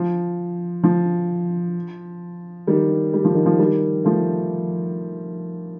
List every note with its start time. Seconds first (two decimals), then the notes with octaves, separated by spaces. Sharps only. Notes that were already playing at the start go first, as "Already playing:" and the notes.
Already playing: F3
0.84 F3
2.67 D#3 G3
3.14 G3
3.25 F3
3.35 D#3
3.46 F3
3.59 D#3 G3
4.04 F3 A3